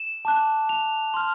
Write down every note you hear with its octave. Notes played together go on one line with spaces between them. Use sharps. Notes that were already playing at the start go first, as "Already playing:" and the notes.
Already playing: E7
A5 D6 F#6
F7
C6 F6